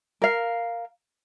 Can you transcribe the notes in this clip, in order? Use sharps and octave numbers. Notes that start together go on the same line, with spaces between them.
A#4 F5